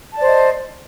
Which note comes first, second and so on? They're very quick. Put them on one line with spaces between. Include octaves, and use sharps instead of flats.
A5 D5 C5 D#5